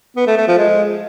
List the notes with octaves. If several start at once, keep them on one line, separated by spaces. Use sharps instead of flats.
B3
A3
A3
F3
G#3